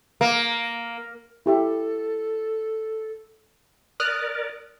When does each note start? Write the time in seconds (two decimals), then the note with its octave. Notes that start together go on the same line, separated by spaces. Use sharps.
0.21 A#3
1.46 E4 G4 A4 E5
4.00 A#4 D5 D#6 F6 F#6